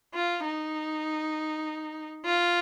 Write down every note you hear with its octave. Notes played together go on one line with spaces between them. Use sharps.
F4
D#4
F4